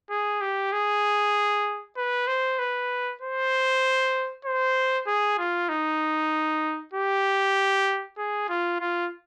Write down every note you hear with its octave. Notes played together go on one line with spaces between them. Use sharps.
G#4
G4
G#4
B4
C5
B4
C5
C5
G#4
F4
D#4
G4
G#4
F4
F4